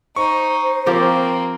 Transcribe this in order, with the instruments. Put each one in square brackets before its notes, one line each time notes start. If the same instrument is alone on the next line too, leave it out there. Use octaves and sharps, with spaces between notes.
[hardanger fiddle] D#4 [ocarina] C5 [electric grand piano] C#6
[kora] F3 G4 A#4 [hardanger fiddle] A#3 C4